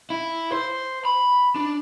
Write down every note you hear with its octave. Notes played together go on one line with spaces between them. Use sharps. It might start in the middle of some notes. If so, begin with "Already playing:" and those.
E4
C5
B5
D4